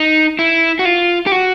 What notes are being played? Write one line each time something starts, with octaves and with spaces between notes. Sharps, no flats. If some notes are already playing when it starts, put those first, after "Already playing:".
Already playing: D#4
E4
F#4
F4
G4
F#4